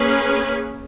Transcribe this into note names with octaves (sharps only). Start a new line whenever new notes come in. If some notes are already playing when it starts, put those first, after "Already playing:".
Already playing: A#3 C#4 G#4 B4